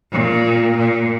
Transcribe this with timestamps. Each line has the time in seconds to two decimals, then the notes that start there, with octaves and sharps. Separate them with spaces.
0.12 A#2
0.77 A#2